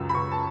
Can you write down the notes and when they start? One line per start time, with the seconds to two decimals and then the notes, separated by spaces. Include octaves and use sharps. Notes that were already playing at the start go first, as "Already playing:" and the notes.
Already playing: C#2 F#2 E6
0.09 B5
0.14 C#2 C#6
0.32 A5